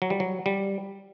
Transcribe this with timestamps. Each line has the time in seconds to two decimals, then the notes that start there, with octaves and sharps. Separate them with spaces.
0.02 F#3
0.10 G3
0.20 F#3
0.46 G3